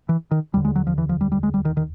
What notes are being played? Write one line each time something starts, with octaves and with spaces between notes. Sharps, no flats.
E3
D#3
F1 D#2 D3 G3
G#3
F#3
F3
E3
F3
G3
G3
G#3
G3
D#3
D#3